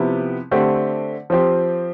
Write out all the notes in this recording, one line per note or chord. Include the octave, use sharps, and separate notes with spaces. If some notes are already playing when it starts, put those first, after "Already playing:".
Already playing: C3 F3 B3 E4 G4
D3 A3 C4 G4
F3 C4 G4